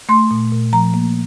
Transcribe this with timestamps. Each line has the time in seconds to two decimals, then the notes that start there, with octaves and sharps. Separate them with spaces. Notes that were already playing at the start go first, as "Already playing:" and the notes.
0.09 A3 C6
0.31 A#2
0.52 A#2
0.73 F3 A#5
0.94 A#3